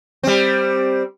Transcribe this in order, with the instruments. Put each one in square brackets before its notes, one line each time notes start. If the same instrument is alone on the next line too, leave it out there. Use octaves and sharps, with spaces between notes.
[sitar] G3 C4